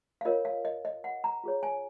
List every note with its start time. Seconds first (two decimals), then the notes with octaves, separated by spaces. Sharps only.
0.21 F5
0.25 F4 A#4 C#5 D#5
0.45 F5
0.65 D#5
0.85 D#5
1.04 F#5
1.24 A#5
1.44 F4 G#4 C#5
1.63 G#5